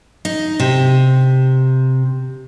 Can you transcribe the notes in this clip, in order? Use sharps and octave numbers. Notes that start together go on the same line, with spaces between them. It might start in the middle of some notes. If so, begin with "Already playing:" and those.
D#4
C3